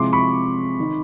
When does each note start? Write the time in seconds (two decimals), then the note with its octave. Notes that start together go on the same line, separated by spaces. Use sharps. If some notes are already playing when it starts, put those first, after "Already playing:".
Already playing: C3 F3 G#3 C4 E4 C6 D6
0.13 B5 C#6
0.80 D#3